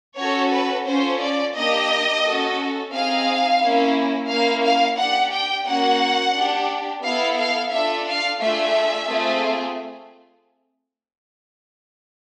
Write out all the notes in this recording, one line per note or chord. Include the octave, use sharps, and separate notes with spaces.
C#4 F#4 A4 C#5
B4
C#4 F4 A4 C5
D5
A#3 D4 G4 D#5
C#4 F#4 A4
C4 D#4 G#4 F5
A#3 C#4 E4
A#3 C#4 E4 F5
F5
D4 G4 F#5
G5
A#3 C#4 F#4 F#5
D4 G4
B3 E4 A4 F5
F5
D4 F4 A4 E5
F5
A3 D4 F4 G#4 E5
A3 C4 F4 G#4